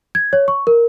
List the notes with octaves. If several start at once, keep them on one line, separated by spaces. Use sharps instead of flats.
G#6
C#5
C#6
A#4